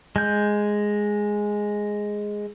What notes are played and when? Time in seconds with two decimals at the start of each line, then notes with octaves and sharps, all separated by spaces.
0.16 G#3 G6